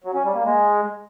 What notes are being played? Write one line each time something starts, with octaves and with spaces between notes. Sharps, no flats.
F#3
C#4
G3
A#3
G#3